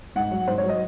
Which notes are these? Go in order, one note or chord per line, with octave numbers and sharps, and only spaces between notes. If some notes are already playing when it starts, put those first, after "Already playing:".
G#2 F#5
F#3
G#2 C5
C#5
F#3
D#5